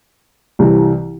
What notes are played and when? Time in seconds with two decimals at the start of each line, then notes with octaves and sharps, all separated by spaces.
0.59 C2 C3 E3